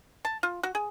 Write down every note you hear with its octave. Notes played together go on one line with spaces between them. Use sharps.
A5
F4
F#4
G#4